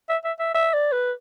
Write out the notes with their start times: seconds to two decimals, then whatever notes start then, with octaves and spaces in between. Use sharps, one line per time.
0.09 E5
0.24 E5
0.39 E5
0.54 E5
0.73 D5
0.92 B4